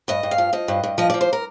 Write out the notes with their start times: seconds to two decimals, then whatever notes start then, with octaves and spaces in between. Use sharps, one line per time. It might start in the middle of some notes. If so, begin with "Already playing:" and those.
0.08 G2 D#5
0.23 G2
0.31 F5
0.38 F3
0.53 F3 D#5
0.68 G2
0.83 G2
0.98 F3 D#5
1.10 F3 D5
1.21 C5
1.33 A#4